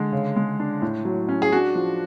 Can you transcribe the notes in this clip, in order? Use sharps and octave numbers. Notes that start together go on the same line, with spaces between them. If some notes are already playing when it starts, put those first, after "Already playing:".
Already playing: D3 G#3
C#3
G#3
D4
A2
F#3
C#4
G#4
D4 F#4
F3